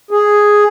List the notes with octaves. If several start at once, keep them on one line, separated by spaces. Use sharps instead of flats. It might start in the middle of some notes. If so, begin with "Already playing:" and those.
G#4